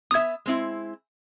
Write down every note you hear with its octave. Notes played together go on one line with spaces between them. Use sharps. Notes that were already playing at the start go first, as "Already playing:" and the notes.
B3 E5 D#6 G#6
G#3 C4 E4